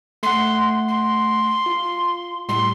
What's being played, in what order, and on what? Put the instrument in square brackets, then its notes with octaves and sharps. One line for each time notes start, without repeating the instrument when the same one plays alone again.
[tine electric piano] A3 F#5 [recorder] C6
[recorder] C6
[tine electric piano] F4
[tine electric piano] A2 G3 [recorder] C6